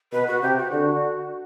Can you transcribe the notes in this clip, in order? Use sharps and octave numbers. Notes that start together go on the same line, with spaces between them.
B2 B4
F#4
C3 G4
F#4
D3 F#4